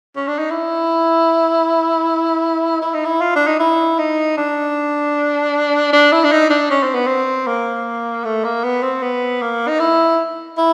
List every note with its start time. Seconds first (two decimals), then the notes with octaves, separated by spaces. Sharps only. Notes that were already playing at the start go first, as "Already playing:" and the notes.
0.16 C#4
0.28 D4
0.39 D#4
0.50 E4
2.82 E4
2.94 D#4
3.05 E4
3.21 F4
3.35 D4
3.47 D#4
3.60 E4
3.98 D#4
4.37 D4
5.93 D4
6.12 E4
6.24 D4
6.32 D#4
6.50 D4
6.70 C#4
6.83 C4
6.94 B3
7.06 C4
7.47 A#3
8.24 A3
8.44 A#3
8.64 B3
8.83 C4
9.02 B3
9.42 A#3
9.68 D#4
9.79 E4
10.58 E4